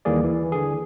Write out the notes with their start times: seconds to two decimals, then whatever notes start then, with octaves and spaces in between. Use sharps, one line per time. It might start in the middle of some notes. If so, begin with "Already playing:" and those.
0.05 D#2 E3 G3 A#3 G#4 D5
0.24 E3
0.52 D3 G#4